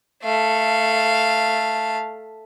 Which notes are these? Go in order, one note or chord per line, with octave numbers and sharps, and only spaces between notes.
A3 F5